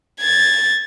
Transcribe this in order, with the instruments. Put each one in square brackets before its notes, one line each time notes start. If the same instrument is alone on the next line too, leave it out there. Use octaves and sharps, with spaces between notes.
[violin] G#6 A6